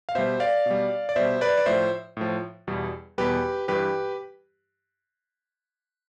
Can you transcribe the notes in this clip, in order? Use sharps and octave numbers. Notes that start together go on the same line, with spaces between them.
F5
B2 G3 C5 E5
D5 F5
B2 G3
D5
B2 G3 C5 E5
B4 D5
D5
A2 F3 C5 E5
A2 F3
E2 B2 G3
E2 B2 G3 G4 B4
G2 E3 G3 G4 B4